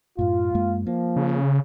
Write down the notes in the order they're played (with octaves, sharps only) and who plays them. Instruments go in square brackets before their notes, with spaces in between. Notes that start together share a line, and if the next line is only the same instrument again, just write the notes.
[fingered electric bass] F#2 A2 [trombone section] F4
[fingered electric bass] F#2 G#3 A#3
[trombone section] F3 [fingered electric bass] A#3
[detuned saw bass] C#3